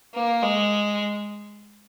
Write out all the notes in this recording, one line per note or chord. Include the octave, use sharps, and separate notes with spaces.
A#3
G#3